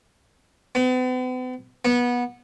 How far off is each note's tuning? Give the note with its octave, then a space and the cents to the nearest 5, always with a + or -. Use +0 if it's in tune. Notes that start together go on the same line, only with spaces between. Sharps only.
B3 +45
B3 -20